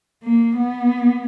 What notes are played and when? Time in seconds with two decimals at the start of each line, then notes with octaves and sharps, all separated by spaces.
0.23 A#3
0.57 B3